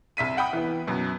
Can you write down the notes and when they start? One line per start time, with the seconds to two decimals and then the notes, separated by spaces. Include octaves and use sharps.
0.17 C2 E5 B6 D#7
0.37 F#5 G5 B5 D#6
0.53 E3 B3
0.87 F#2 B2